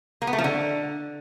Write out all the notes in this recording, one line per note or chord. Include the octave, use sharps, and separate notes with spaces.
A#3
B3
A3
F3
D3